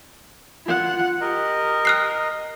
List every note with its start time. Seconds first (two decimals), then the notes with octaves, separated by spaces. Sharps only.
0.66 F4 F#5
1.21 G4 A#4 D#5
1.85 F6 F#6 C7